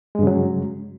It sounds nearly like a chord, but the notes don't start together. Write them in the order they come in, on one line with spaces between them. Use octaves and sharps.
G#3 G2 C#3 F#3